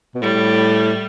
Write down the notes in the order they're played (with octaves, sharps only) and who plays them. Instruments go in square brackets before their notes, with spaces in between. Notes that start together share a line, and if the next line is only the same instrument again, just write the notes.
[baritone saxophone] B2
[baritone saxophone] A2 [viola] G3